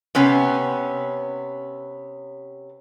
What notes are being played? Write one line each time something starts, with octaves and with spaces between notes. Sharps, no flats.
C3 B3 C#4